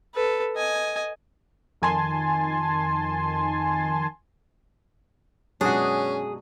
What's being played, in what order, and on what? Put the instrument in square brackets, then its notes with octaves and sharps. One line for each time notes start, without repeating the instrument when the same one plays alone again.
[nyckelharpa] A4 B4
D#5 G#5
[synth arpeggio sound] F2 D#3 G#5 A5 C6
[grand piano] F#2 B2 G#3 [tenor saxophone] C#4 [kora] D4 F#4 [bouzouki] G#4